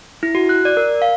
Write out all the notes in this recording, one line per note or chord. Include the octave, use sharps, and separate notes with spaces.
E4
F#4
F#6
D5
A#4
F5